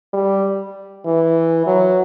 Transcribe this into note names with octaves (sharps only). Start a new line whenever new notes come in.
G3
E3
F#3